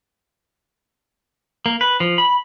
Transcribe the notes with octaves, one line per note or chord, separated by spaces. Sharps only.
A#3
B4
F3
B5